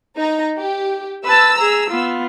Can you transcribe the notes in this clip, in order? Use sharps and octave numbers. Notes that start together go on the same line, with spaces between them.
D#4 A#5
G4
B4 A5 E6
G#4 A#5
B3 F4